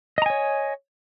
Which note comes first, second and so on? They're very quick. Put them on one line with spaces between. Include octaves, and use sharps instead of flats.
D#5 A#5 G#5 C#5